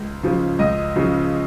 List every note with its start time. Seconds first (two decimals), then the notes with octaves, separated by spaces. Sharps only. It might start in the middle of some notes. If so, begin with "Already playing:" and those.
Already playing: C#2
0.23 C#3 F3
0.59 C#2 D#5
0.96 C#3 F3